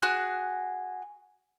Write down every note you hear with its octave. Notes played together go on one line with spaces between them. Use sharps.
F#4 G#4 F#6